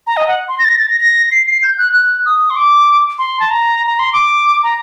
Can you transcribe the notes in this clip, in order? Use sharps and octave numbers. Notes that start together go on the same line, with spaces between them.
A#5
D#5
F#5
C6
A#6
A6
A#6
A6
A#6
A#6
C7
C7
G6
F#6
F#6
D#6
C6
D6
C6
A5
A#5
A#5
C6
D6
A#5